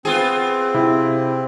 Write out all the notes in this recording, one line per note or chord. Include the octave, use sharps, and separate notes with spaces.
B3 C4 F4 G#4
C3 E4